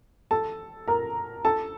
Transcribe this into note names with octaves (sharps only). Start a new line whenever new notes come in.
A4 A5
A#4 A#5
A4 A5